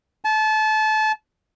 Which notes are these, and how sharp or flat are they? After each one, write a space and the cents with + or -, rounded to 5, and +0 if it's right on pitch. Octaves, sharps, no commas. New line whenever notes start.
A5 -25